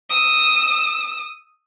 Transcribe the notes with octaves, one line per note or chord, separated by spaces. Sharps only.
D#6 E6